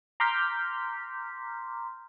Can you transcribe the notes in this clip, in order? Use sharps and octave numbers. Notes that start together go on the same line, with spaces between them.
A#5 C6 D6 F6 G6 B6